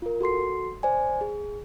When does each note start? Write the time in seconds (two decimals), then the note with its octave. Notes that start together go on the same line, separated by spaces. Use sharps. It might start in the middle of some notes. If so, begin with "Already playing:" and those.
0.02 F4 A#4
0.21 F#4 A4 C6 C7
0.83 C5 D5 G#5
1.21 G#4